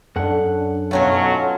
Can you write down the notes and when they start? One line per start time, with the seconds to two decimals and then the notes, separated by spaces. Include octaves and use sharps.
0.16 F#2 D4 A4 F#5
0.91 B1 F#3 A3 C#4 F4